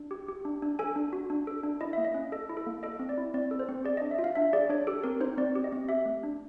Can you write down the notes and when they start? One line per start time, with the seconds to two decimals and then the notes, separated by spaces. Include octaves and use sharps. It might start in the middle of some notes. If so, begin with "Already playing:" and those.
Already playing: D4
0.11 G4
0.29 G4
0.45 D4
0.62 D4
0.79 A4 G#5
0.96 D4
1.13 F#4
1.30 D4
1.47 A4
1.63 D4
1.81 E4 D#5
1.93 A#3 E5
2.05 D#5
2.14 C#4
2.32 A4 D#5
2.49 E4
2.57 A4
2.67 A#3
2.83 A4 D#5
2.99 C4
3.09 D5
3.18 E4
3.34 C4 D5
3.51 A4
3.59 C5
3.69 C4
3.84 G#4 D5
3.97 D#5
4.02 D4
4.11 E5
4.19 F4
4.24 F5
4.35 D4 E5
4.53 G#4 D5
4.69 D4 C#5
4.87 G4 A4
5.04 C4 A#4
5.21 D#4 C5
5.38 C4 D5
5.55 G4
5.64 D#5
5.72 C4
5.89 G4 E5
6.06 A3
6.23 D4